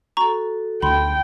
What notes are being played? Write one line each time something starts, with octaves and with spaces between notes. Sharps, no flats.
F#4 A4 A#5 C#6
D2 G5 B5 C6